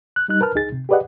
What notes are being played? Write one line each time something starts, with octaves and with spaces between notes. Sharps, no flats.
F#6
G3 D#4 F#6
A#4 B4 A5 F6
C#2 D#4 G#4 A6
C3
G4 G#4 B4 D5 D#5 F#5